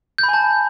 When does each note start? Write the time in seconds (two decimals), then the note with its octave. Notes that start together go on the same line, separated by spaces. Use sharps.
0.18 G6
0.23 B5
0.28 G#5
0.33 A5